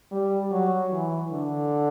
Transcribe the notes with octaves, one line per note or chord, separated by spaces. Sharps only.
G3
F#3
E3
D3